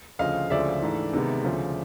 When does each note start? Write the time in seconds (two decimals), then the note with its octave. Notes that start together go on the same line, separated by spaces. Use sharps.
0.19 D2 C#3 F3 D#5 F5
0.50 D2 C#3 F3 G#3 D5 E5
0.82 G#2 E3 A3 D4
1.13 C3 D#3 G#3 B3
1.44 D2 C#3 F3